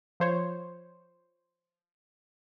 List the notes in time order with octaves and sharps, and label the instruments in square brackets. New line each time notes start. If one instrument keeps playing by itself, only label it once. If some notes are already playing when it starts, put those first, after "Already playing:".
[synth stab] F3 C5 C#5